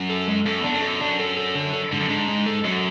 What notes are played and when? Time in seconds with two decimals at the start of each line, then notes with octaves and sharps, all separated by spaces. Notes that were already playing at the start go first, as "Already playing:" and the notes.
Already playing: F#2
0.10 A4
0.28 G#3
0.46 F#2 A4
0.60 E2 D4
0.74 F#2
0.82 A4
1.00 D4
1.20 A4
1.37 A4
1.55 D3
1.73 A4
1.91 G#2 D3
2.00 F#2
2.09 G#2 D4
2.28 G#3
2.46 A4
2.64 F#2 F#3